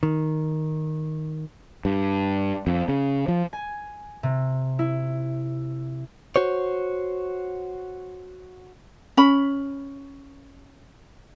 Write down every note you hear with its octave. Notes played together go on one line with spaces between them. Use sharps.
D#3
G2
F2
C#3
F3
G#5
C3
E4
F#4 C5 C#5
C#4 B5